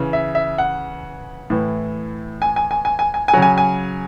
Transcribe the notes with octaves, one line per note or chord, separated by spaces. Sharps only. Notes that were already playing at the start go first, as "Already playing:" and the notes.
Already playing: C#3 E3
E5
E5
F#5
A2 E3
G#5
G#5
G#5
G#5
G#5
G#5
G#5
C#3 F#3
G#5
G#5